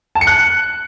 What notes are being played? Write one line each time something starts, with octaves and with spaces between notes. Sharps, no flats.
A5
C#7
F#6